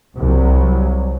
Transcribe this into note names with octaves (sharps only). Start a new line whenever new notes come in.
C2 F#3